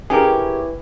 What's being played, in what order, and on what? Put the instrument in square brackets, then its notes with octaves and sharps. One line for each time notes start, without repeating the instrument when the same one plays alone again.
[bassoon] E3 [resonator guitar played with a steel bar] C#4 G4 [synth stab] G#4 A#4